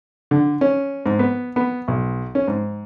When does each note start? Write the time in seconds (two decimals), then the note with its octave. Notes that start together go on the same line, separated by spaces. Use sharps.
0.31 D3
0.61 C#4
1.06 G#2
1.19 B3
1.56 B3
1.88 B1
2.35 C#4
2.48 G#2